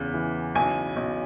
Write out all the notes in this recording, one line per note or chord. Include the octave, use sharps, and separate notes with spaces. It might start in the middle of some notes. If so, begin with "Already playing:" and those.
Already playing: E2 C#3
E3
B1 G#5
B1